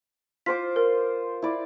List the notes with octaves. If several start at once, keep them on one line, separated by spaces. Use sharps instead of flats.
F4 C5 D6 B6
A#4
E4 D5